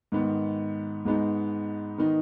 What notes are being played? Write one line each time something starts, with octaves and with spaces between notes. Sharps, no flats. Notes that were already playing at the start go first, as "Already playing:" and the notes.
G#2 D#3 B3
G#2 G#3 B3 D#4
D#3 B3 D#4